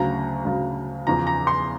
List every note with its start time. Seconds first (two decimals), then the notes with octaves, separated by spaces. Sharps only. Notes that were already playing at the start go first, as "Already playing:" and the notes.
Already playing: D2 C#3 F#3 A#5
0.45 D2 C#3 F#3
1.07 E2 C#3 F3 A#5
1.27 A#5
1.47 C6